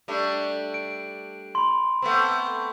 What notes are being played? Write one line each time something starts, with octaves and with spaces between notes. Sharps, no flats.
G3 A3 D4
D7
B5 C6
A3 B3 C4